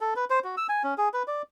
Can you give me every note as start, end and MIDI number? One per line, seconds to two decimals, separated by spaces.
0.01 0.14 69
0.16 0.25 71
0.30 0.39 72
0.44 0.55 66
0.57 0.67 88
0.69 0.83 80
0.84 0.94 61
0.98 1.09 68
1.14 1.23 71
1.28 1.42 74